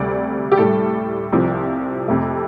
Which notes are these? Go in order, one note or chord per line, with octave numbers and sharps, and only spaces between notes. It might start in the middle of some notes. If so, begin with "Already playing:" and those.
Already playing: D2 C3 G3 D5
G4
A2 G3 A4
C2 C3 F3
F2 C3 A3